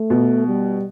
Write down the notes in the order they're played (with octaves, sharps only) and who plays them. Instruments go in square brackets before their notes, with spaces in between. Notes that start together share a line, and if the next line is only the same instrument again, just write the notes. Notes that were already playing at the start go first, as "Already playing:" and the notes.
Already playing: [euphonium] A3
[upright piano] B2
[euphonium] G3